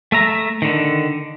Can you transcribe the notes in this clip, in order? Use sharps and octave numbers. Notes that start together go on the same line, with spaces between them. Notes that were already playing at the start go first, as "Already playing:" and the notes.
A3 E5 A#5
D3 D#3